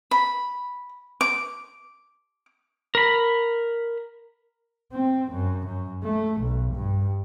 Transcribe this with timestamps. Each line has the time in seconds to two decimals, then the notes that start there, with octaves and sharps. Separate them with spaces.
0.11 B5
1.21 D6
2.95 A#4 B5
4.93 C4
5.32 F#2
5.66 F#2
6.03 A3
6.41 B1
6.74 G2